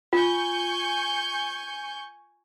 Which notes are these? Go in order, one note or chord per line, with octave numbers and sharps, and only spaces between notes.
F4 G#5 C#6 G6